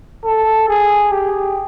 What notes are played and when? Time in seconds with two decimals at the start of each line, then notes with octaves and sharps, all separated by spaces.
0.24 A4
0.68 G#4
1.12 G4